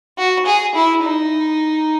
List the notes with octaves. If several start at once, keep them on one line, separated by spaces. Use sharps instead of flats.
F#4
G#4
E4
D#4